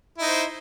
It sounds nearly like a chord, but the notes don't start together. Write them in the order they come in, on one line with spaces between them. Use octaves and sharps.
E4 D#4 C5